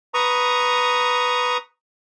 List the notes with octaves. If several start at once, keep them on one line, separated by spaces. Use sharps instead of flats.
B4 A#5 C#6 D#6